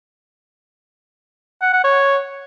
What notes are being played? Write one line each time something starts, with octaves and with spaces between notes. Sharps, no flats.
F#5
F#5
C#5